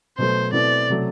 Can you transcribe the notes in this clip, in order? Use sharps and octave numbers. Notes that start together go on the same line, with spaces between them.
B2 F#3 A3 C5
B2 A3 C4 E4 A4 D5
C3 F#3 A3